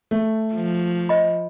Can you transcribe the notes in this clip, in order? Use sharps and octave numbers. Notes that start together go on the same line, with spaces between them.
A3
F3
C5 D#5 B5